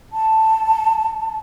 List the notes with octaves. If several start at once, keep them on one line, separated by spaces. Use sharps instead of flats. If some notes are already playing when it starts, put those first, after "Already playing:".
A5